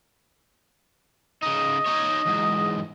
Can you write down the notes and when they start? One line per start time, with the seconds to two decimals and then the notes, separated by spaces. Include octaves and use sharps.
1.43 C#3 D#4 D#5
1.86 D#4 C#5
2.26 E2 G#2